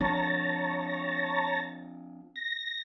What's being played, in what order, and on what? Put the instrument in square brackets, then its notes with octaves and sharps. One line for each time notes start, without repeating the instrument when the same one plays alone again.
[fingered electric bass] F3 C4 D4 [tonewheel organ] C#5 A5 A#5
[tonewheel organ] A#6